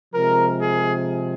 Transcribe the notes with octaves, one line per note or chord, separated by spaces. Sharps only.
C3 F3 G#3 A#4
G#4